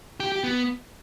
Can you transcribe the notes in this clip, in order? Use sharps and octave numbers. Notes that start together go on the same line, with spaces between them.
G4
G4
B3